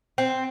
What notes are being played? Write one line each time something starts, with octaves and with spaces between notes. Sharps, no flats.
C4